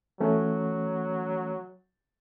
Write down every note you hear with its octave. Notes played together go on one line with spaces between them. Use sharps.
E3 F#3 A3 C#4